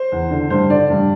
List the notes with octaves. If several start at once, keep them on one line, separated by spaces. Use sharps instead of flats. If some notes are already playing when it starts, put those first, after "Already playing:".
Already playing: C5
E2
D3
G2 C5
D3 D5
G2